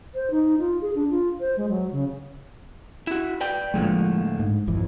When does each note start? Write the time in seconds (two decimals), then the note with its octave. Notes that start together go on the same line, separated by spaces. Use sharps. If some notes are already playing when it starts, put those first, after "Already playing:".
0.15 C5
0.31 D#4
0.59 F4
0.82 G#4
0.96 D4
1.10 F4
1.40 C5
1.57 G#3
1.69 F#3
1.92 C#3
3.07 E4 F#4
3.41 B4 D5 G5
3.74 A2 D3 F3 F#3 G#3 A#3
4.39 G#2
4.67 G#1 F2 E3